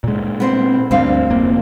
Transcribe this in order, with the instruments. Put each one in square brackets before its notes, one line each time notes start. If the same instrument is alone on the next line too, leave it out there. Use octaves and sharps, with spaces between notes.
[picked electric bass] A#2 G#3
[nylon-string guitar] B3 C4 C5
[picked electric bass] D2 G2 [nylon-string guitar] C4 G4 F5
[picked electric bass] F1 A#3